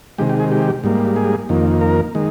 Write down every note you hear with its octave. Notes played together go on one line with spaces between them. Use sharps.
C3 D#3 G#3 G4
G4
G#4
G4
G#2 G3 A#3
G#4
F2 D#3 A#3
A#4
D#3 G#3